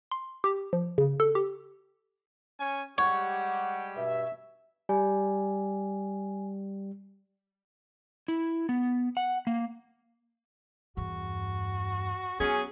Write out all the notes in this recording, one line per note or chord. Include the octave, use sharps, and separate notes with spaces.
C6
G4
F3
C#3
A4
G4
C#4 C#5 G#5
G3 G#3 G4 C#5 F#5
G2 B2 E5
G3 G#5
E4
B3
F#5
A#3
E2 G2 F#4
F#3 B3 C#4 G#4